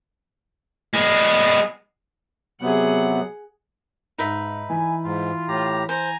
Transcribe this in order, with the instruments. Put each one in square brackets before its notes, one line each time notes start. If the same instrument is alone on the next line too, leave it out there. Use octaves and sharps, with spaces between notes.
[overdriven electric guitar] G#3 B3
[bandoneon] C3 F#3 B3 [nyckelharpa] G#4 F#5
[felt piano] G#2 [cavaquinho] D#4 B4 E5
[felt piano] E3 E4 B5 [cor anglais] G#5
[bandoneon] G#2 [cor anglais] F4
[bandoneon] A2 G4 A#5
[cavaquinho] C5 [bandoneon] G#5 A#5